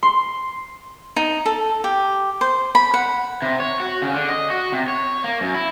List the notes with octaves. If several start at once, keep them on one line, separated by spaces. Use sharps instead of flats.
C6
D#4
A4
G4
C5
B5
F#5
C3
C#5
F#4
C#3
D3
D#5
F#4
C3
C#5
A#3
F#2
E4